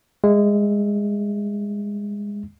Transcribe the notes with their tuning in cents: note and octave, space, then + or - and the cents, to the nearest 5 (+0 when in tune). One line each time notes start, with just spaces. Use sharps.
G#3 -20 E5 +0